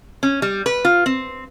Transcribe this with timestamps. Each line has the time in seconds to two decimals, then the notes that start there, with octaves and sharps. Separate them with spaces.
0.23 C#4
0.42 G3
0.66 B4
0.85 F4
1.06 C4